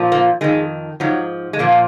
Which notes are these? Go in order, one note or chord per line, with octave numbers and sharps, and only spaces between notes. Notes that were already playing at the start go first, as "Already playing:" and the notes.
Already playing: A#2 F3
A#3
F2 D#3 G#3
G#2 F3 F#3
G#3
A#2 F3 A#3